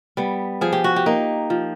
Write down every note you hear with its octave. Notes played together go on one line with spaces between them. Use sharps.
G3 B3
F3 G#4
G4
F#4
G4
A#3 D#4
F3